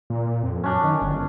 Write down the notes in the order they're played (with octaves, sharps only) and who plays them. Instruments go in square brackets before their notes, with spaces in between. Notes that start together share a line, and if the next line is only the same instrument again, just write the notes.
[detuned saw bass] A#2
F2
[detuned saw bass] F#2 [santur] C#4 D4
[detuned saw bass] D#3
G1